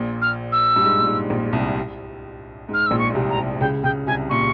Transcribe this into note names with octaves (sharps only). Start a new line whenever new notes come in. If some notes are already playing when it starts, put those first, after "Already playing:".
Already playing: A#1 A#2
F6
E6
G2
G#2
A#2
G#2
A#1 A#2
C2 C3
G#2
F6
A#1 A#2 E6
C#6
A#2
C2 C3
A#5
C2 C3
C#2 C#3 G5
C#2 C#3 G5
C2 C3 G#5
A#2 C#6